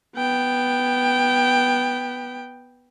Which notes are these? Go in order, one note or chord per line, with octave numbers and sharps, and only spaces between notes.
B3 G5